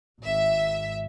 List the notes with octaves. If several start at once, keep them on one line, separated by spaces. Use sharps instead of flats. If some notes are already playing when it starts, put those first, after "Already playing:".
G#1 E5